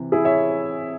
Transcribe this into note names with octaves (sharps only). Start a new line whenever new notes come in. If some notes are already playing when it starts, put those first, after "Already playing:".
Already playing: C3 E3
E4 G#4
C#5 E5